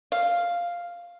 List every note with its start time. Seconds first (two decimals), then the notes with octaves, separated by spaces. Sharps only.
0.12 F5